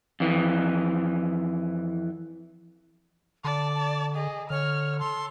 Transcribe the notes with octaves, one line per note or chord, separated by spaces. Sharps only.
F2 E3
D3 D5 A5
A5
G#4 D#5
D3 C#5 F6
A4 C6